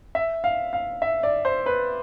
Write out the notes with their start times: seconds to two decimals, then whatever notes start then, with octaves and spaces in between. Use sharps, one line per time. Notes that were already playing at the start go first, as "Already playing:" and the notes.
0.15 E5
0.44 F5
0.73 F5
1.02 E5
1.23 D5
1.45 C5
1.66 B4